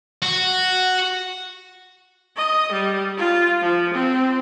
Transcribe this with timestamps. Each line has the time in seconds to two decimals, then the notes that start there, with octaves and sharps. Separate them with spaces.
0.22 F#4
2.37 D#5
2.72 G3
3.17 F4
3.62 F3
3.94 C4